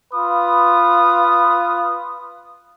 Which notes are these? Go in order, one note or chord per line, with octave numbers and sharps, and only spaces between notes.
F4 B4 B5 D#6